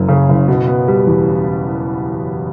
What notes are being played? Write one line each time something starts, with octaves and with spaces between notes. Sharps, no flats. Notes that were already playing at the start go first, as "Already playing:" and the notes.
Already playing: F#1 F#2
C#3
F#1
B2
B3
G3
E2